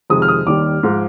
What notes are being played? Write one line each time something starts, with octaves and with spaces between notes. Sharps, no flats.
F2 C3 D#3 G#3 D#6
F6
D#6
D#2 D#3 G3 D6
G#2 F3 G#3